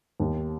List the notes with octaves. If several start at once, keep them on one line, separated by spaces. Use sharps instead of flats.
D#2